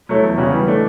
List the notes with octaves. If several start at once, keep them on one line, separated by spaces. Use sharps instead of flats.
F#3 A3 E4
E2
C#3 G3 C#4 F#4
E3
A3 D4